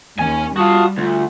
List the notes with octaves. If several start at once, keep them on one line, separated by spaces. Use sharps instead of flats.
D#2 C#4 G#5
G3 F4 F#4 F5 A5 D#6
D2 F4